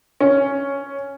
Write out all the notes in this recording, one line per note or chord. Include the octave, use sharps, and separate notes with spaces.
C#4